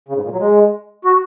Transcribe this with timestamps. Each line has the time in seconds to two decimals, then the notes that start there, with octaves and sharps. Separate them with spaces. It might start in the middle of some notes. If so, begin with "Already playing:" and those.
0.09 C#3
0.16 G#2
0.24 A#2
0.32 F#3
0.40 G#3
1.05 F#4